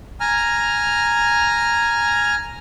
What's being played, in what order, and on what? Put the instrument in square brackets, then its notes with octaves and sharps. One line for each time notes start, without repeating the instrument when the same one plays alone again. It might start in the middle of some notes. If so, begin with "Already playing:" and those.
[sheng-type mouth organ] G#5 A#5 F6